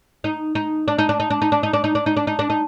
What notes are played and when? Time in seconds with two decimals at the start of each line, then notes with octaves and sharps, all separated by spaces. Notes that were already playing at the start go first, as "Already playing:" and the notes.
0.24 D#4
0.55 D#4
0.88 D4
0.98 D#4
1.09 D4
1.20 D#4
1.30 D4
1.42 D#4
1.52 D4
1.63 D#4
1.73 D4
1.84 D#4
1.95 D4
2.06 D#4
2.17 D4
2.27 D#4
2.39 D4
2.50 D#4